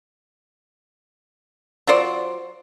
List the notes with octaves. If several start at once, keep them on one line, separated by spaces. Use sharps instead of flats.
F#3 F4 C5 D5